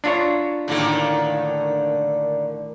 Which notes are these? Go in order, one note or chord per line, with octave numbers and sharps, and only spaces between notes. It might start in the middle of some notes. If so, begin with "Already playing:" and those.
D4 F4 C#5 E5 A#5 B5
A2 D3 D#3 A#3 A4